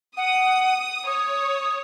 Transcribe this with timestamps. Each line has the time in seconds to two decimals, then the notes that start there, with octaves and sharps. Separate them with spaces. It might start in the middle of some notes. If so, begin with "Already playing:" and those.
0.17 F#5 D#6
1.07 C#5 D#6